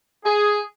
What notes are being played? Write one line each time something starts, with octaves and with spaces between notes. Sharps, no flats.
G#4